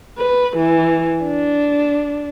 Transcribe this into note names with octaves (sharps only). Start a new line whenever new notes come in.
B4
E3
D4